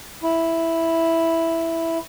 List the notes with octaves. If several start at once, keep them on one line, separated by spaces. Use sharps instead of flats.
E4